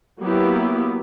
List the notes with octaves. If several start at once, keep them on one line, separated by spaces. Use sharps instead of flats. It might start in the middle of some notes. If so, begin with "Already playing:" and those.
F#3 A#3 B3 E4 G4